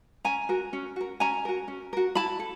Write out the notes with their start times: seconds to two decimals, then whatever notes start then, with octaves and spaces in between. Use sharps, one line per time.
0.25 C#4 G#5 A#5
0.49 F#4 A#4
0.73 C#4
0.96 F#4 A#4
1.20 C#4 G#5 A#5
1.45 F#4 A#4
1.68 C#4
1.93 F#4 A#4
2.15 E4 A5 B5
2.39 A4